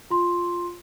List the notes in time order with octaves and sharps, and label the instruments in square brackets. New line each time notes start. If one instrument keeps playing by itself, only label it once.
[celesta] F4 C6